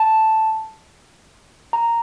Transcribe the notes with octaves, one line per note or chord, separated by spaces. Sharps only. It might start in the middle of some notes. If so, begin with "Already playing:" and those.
Already playing: A5
A#5